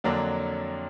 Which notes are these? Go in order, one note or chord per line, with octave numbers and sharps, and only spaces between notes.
F2 D3 F#3 A#3 D4